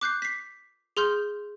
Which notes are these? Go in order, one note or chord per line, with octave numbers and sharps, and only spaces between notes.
D6 F#6 G6 C7
B6 C7
G#4 C6 F6 G6